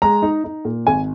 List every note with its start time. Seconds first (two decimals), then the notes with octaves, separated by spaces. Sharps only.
0.02 G#3 A#5
0.22 D#4
0.44 D#4
0.65 A#2
0.87 G#1 G#5